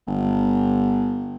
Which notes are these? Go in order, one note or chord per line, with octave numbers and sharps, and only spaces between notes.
G1